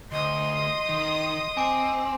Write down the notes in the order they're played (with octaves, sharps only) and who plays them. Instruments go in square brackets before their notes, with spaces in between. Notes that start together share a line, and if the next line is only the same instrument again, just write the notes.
[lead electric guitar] D2 [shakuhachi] D#5 [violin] C6 D#6
[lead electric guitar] D#3
[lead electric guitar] C4 [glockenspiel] G#5 D6 D7